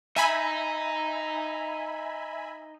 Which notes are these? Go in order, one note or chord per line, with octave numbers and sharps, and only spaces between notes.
D#4 E5 G#5 B5